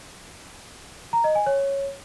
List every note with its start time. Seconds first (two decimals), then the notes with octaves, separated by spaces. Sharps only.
1.13 A#5
1.24 D#5
1.35 G#5
1.46 C#5